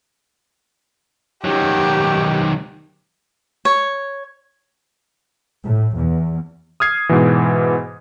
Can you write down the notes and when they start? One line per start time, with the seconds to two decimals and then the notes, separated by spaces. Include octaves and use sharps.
1.44 D#3 F#3 G4
3.65 C#5
5.63 A2
5.96 E2
6.80 D#6 F6 G#6 C7
7.09 G#2 B2 E3